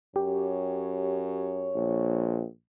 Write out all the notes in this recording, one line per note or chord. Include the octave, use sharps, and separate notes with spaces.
F#2 G4 C#5
A#1